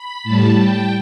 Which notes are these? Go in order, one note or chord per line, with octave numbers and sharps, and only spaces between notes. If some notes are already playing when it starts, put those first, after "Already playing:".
Already playing: B5
A2 G3 A5
G5